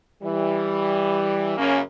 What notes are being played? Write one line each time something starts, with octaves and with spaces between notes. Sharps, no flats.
E3 G3
F#2 C#3 A#3 C#4